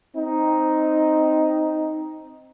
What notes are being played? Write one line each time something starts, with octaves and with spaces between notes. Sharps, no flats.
C4 D#4